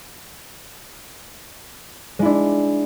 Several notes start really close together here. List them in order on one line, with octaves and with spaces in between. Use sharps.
G#3 E4 D4